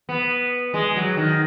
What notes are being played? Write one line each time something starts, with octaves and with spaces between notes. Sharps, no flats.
B3
G#3
F#3
D#3